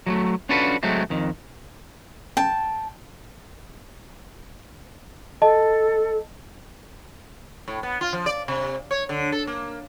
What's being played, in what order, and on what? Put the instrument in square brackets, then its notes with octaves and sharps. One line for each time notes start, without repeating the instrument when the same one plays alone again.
[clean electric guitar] F#3 G#3 A3
C#4 D4 F4 F#4 A4 B4
F#3 G#3 A3 C4
F2 D#3
[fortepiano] G5 [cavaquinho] A5
[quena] A4 [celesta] D#5 A5
[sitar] A2
B3
F4
F3
D5
C3
C#5
D3
A4
A#3